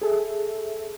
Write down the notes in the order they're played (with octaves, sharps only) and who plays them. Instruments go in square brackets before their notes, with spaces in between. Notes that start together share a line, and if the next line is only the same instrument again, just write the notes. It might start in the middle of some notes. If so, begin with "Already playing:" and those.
[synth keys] G#4 A4 E5